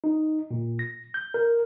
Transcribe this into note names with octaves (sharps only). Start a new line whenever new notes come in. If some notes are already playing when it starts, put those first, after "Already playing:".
D#4
A#2
A#6
G6
A#4